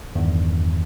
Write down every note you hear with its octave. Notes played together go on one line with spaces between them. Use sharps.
E2 G2 D#3